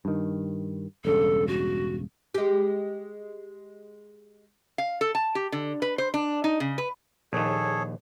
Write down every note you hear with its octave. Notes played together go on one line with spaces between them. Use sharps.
G2 D#3
E1 G2 C#3 A4
F#4
G#3 G4
F5
A4
A5
G4
D3
B4
C5
D4
D#4
C#3
B4
A#1 D#2 G#4 A4 C#5